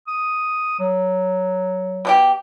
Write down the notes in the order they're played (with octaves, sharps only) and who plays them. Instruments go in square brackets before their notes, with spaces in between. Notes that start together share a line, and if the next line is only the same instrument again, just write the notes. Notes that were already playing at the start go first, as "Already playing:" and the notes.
[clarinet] D#6
F#3
[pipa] B2 D4 G4